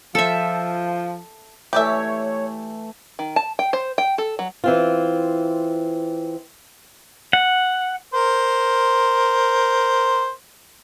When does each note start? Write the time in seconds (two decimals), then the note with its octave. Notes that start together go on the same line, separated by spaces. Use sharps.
0.15 F3 A4 E5
1.73 E3 A3 G4 C#5 D5 E5
3.19 D#3
3.36 A5
3.59 G5
3.73 C5
3.98 G5
4.18 A4
4.39 F#3
4.64 E3 C4 F4
7.33 F#5
8.14 A#4 C5